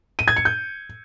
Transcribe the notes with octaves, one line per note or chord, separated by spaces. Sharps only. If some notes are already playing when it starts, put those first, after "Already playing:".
D#7
G#6
C#7
G6